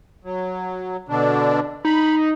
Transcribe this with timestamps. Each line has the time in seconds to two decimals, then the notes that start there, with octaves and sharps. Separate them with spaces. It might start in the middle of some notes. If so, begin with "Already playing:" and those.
0.24 F#3
1.09 B2 D3 D4
1.85 D#4 B5